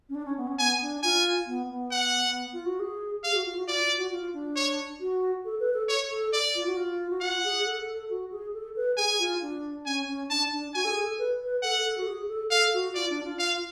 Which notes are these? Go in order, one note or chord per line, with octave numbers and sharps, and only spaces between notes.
C#4
D4
C#4
B3
C#4
B3 G#5
D4
F4 G#5
B3
B3
F#5
F4
F#4
G#4
G#4 F5
F#4
F4
F#4
F4 D5
F4
F#4
F4
D4
C#5
F#4
A4
B4
A4
C#5
A4
D5
F4
F#4
F4
F#4
F4 F#5
G#4
A4
A4
F#4
G#4
A4
B4
G#4 G#5
F4
D4
C#4 G#5
C#4
D4 A5
D4
F#4 G#5
A4
G#4
A4
B4
B4
A4 F#5
A4
F#4
G#4
A4
A4 F5
F#4
F4 D5
D4
F4
F5